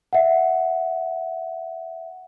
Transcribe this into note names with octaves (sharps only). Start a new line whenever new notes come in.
E5 F#5